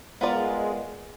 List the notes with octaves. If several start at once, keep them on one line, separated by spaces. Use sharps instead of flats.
G#3 B3 F4 A#4 D5